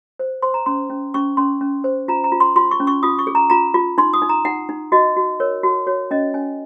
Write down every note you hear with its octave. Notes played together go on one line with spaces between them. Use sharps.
C5
C5 C6
A#5
C#4 C6
C#4
C#4 C#6
C#4 C6
C#4
C5
F4 A#5
A#5
F4
C6
F4 C6
C#6
C#4
C#6
F4 D#6
C#6
G#4
A#5
F4 A#5
F4
D#4 C6
D#6
D#4
A#5
D#4 F#5
D#4
F#4 D#5
F#4
A#4 C#5
F#4
F#4 C#5
C#4 D#5
C#4 G#5